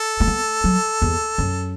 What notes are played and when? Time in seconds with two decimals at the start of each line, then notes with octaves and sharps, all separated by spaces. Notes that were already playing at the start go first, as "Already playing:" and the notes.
Already playing: A4
0.20 A3
0.27 B3
0.64 F#3
1.02 E2
1.38 F#2